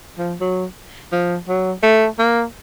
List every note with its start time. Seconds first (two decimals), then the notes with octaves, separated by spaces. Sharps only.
0.18 F3
0.41 F#3
1.12 F3
1.48 F#3
1.83 A3
2.19 A#3